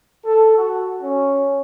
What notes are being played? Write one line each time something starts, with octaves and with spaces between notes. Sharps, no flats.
A4
F#4
C#4